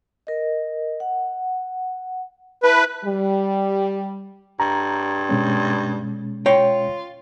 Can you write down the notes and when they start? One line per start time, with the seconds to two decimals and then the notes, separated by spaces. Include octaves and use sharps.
0.27 A#4 D#5
1.00 F#5
2.63 E4 B4 E5 A5
3.05 G3
4.60 G2 A#5
5.29 B2 G#3 C#4
6.46 F4 C#5 G5